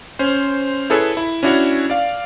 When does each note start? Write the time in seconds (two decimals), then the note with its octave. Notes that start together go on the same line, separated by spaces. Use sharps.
0.19 C#4 C5
0.90 E4 G#4 A4 B4 C#5
1.17 E4
1.43 C#4 D4 E4 F#4 C#5
1.90 D5 F5